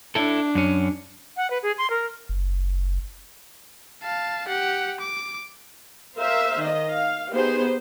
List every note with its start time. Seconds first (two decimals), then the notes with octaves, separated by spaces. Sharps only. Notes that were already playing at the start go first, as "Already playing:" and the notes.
0.15 D4 E4 A4
0.55 F#2 C#4
1.37 F#5
1.50 B4
1.63 G#4
1.78 C6
1.90 A#4
2.29 F#1
4.03 F5 A5
4.48 G4 F#5
5.01 D6
6.17 A#4 C5 E5 F5
6.58 D#3 D#5
6.91 F5
7.31 B3 D#4 G4 G#4 C5